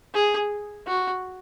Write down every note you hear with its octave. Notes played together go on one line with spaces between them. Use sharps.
G#4
F#4